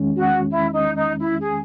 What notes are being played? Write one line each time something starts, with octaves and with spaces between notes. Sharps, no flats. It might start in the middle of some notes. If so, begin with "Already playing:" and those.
Already playing: E2 D#3 G#3 C#4
F#4
E4
D#4
D#4
E4
G#4